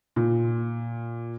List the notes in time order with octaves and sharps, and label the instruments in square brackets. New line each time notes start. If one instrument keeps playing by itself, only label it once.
[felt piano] A#2